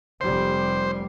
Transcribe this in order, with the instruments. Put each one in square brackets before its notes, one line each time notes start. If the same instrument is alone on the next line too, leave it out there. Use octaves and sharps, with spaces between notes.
[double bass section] F1 G3 [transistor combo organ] C5